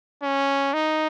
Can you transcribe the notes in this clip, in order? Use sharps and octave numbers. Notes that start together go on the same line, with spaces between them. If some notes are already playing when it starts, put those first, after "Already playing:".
C#4
D#4